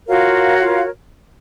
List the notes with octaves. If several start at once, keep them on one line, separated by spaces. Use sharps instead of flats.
F4 F#4 A#4 C#5 F5
F#5
F4 F5